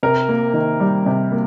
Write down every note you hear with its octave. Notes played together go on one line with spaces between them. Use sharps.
C3 A#4
A#3
D#3
G3
C3
A#3